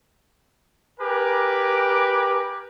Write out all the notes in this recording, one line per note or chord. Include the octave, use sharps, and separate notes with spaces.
G4 A#4 B4 G#5 D6